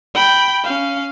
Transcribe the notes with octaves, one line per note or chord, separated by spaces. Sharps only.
G5 B5
C#4 F5